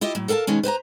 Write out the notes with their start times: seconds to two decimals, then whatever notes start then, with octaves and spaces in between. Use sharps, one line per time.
0.01 E4 F4 G4 D#5
0.15 A2 F#3
0.28 A4 A#4 F5 G5 A5
0.47 B2 D#3 G#3 C#4
0.63 B4 C5 G#5 A#5